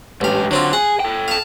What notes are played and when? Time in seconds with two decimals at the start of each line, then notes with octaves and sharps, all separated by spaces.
0.21 A1 G#2 G4 F5
0.51 D3 F#3 C4 F4
0.73 G#4 F#5
1.00 A4 G5
1.28 F5 A5